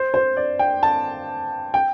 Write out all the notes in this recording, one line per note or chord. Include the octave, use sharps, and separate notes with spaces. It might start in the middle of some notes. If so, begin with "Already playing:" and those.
Already playing: C5
C5
D5
G5
A5
G5